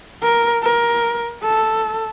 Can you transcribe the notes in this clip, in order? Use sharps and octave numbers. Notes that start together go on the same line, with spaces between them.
A#4
A#4
A4